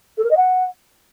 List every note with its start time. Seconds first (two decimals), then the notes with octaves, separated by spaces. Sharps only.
0.17 A4
0.24 A#4
0.30 D#5
0.37 F#5